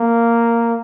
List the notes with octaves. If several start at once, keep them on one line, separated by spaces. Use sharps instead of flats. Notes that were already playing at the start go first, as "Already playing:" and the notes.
Already playing: A#3